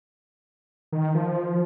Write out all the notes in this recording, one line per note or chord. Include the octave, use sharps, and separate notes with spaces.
D#3
F3